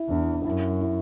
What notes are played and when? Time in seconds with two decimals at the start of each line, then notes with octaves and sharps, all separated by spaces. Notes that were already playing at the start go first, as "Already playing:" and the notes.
Already playing: E4
0.09 E2 D4
0.45 F#2 E4
0.81 E4